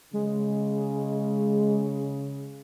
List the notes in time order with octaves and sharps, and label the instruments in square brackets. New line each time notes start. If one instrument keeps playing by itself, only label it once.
[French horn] C#3 [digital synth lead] G#3